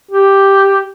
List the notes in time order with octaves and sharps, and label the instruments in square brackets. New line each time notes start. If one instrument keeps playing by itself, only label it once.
[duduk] G4